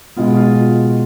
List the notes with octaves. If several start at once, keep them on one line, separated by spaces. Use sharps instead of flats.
B2 G#3 B3 F4
F4